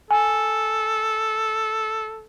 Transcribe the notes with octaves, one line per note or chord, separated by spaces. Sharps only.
A4 G#5